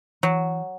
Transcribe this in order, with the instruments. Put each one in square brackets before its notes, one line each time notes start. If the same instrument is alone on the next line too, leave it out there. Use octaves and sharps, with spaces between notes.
[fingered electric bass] E3 [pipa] F#3